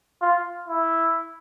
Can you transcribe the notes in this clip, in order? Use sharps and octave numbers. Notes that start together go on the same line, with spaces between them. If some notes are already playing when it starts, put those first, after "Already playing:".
F4
E4